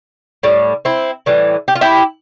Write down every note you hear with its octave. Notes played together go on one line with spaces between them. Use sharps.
A2 G3
C4 E4
A2 E3 G3
G4
F4
E4 G4